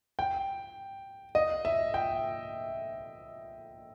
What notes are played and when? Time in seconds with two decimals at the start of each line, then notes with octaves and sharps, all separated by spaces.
0.19 G5
1.35 D#5
1.65 E5
1.94 G5